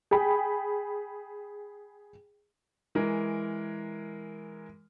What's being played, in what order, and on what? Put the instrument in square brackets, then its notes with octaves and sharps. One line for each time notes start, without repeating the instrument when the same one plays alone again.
[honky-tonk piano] G#4 G5 B5
[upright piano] E3 G#3 A#4